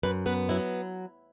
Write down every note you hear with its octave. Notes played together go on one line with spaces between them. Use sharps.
F#2 B4
B3 B4
F#3 E4